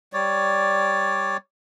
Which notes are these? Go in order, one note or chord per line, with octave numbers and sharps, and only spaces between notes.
G3 C#5 D5